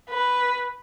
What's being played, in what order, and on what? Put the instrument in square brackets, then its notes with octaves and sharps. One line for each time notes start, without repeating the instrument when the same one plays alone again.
[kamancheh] B4